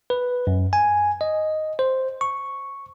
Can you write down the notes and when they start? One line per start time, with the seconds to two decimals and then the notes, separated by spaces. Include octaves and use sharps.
0.10 B4
0.47 F#2
0.73 G#5
1.21 D#5
1.79 C5
2.21 C#6